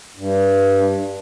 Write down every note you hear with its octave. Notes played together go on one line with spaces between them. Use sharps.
G2